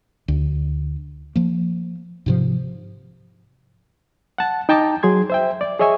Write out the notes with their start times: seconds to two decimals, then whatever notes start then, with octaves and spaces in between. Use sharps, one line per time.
0.28 D2
1.35 F3 A#3
2.26 G#2 C3 F3
4.38 F#5 A5
4.69 D#4 G5 A5 A#5 D6
5.03 F#3 G#4 C6 G#6
5.30 C5 E5 G5
5.61 D5
5.79 G#4 C#5 D#5 E5 G#5 C#6